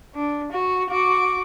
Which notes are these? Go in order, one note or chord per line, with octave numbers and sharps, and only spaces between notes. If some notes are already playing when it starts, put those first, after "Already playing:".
D4
F#4
F#4 D6